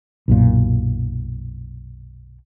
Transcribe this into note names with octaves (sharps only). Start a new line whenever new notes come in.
B1 F#2 A#2